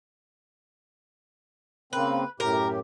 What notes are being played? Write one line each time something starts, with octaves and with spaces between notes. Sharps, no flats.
C#3 A#3 C4 B4
F#2 A2 G4 A#4